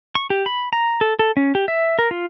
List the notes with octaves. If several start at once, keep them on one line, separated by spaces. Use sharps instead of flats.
C#6
G4
B5
A#5
A4
A4
C#4
G4
E5
A#4
F4